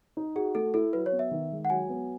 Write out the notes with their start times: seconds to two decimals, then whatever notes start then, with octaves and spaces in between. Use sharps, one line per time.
0.17 D#4
0.35 F#4 G#4
0.55 A3 A4
0.74 E4 A4
0.93 F#3 B4
1.06 C#5
1.12 B3
1.19 E5
1.31 D#3
1.52 G#3
1.65 F#5
1.70 F#3 G#5
1.89 B3